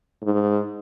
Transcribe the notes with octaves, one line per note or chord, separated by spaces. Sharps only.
G#2